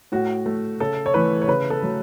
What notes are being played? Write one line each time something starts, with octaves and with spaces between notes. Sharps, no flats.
A2 F#4
A3
C#3 A4
C#5
E3 A3 B4
C#5
C#3 B4
A4
F#3 A3